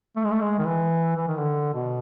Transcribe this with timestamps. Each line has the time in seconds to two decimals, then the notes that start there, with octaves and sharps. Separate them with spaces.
0.16 A3
0.24 G#3
0.31 A3
0.41 G#3
0.59 D#3
0.65 E3
1.17 E3
1.28 D#3
1.37 D3
1.74 B2